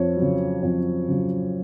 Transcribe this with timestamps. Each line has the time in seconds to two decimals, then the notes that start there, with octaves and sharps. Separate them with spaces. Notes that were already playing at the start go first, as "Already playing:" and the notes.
Already playing: F2 C#5
0.17 F#3
0.22 C#3
0.63 F2
1.08 C#3 F#3